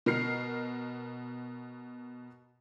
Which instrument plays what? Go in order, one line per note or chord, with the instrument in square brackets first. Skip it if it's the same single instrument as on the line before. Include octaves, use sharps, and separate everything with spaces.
[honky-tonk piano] B2 A#4 F6 C7